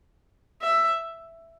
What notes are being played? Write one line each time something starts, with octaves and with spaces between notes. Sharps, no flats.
E5